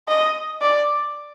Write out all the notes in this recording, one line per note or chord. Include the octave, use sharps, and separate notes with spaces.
D#5
D5